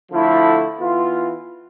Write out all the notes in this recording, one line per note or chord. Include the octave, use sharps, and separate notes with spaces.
D3 F3 A3 E4
E3 B3 F4